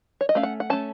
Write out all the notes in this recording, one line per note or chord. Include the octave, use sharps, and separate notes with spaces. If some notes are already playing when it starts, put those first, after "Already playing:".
C#5
D#5
A3 C#4 F5
F#5
F#5
A3 C#4 A5